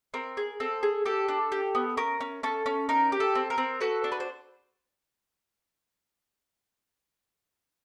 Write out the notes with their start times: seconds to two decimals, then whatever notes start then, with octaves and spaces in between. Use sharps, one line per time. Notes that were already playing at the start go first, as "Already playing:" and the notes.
0.14 C4 A#4
0.37 G#4
0.60 C4 A4
0.83 G#4
1.06 G4 A4
1.28 D4
1.52 G4
1.75 B3
1.97 C#4 A#4
2.20 C#4
2.43 C#4 A4
2.66 C#4
2.89 D#4 A#4
3.12 G4
3.20 A4
3.35 C4
3.50 A#4
3.58 C4
3.80 F#4 A4 B4
4.04 D4
4.12 B4
4.20 C5